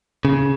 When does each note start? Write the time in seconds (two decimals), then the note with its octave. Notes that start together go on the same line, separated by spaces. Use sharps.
0.25 C#3